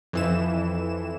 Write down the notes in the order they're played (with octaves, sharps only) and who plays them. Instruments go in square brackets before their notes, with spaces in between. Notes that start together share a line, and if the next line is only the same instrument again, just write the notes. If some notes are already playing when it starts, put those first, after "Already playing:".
[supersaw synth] F2 E3 E7